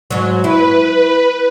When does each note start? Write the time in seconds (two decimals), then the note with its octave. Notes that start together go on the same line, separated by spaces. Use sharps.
0.10 G#2 F#3
0.44 E4 B4